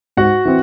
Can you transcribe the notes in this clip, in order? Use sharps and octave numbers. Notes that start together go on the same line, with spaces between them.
G#2 F#4 F#5
E3 C4